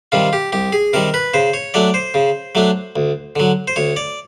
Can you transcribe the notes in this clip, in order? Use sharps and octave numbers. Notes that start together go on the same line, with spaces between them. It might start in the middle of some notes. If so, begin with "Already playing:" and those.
C3 D#3 G3 F4
G4
C2 G4
G#4
C3 D#3 G3 A#4
B4
C#3 C5
C#5
F#3 A3 D4 D5
C5
C#3
F#3 A3 D4
D2
D3 F#3
C5
D2 C#5
D5